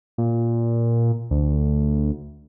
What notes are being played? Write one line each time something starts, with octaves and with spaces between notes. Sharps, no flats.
A#2
D2